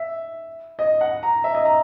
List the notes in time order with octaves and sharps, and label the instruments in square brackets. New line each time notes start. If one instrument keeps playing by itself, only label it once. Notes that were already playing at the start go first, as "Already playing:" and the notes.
Already playing: [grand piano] E5
D#5
F#5
A#5
E5
D#5
A#5